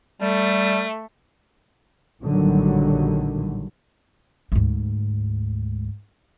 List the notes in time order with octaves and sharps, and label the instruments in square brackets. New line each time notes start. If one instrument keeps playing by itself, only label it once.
[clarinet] G3 [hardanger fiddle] A3
[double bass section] A#1 A2 D3 D#3 F#3 G3
[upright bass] D2 G#2